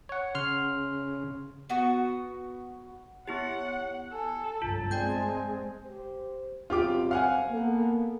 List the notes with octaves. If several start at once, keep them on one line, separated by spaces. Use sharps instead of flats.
C#5 F#5
C#3 C6 F6
B3 F#4
B3 E4 G4 C#5 F#5
A4 G#5
G1 C2 F#2 F4 A5
G#3 C4 D5 G5 G#5 G6
G4 C5
G1 F#2 C4 F4 G4 D6
F5 F#5 G#5
A#3 B3 A4